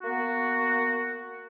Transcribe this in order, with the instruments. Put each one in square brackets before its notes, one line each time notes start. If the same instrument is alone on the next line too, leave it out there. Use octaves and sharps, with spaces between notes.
[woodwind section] A#3 B3 F#4